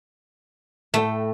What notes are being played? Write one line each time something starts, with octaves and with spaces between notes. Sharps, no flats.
A2 A3 A4 G5